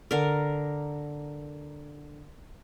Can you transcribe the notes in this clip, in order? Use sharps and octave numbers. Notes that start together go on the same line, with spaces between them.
D3 A#4